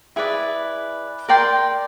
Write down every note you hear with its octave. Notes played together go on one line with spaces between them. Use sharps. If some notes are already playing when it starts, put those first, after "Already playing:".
E4 G#4 B4 D5
A#4 D5 G5 C6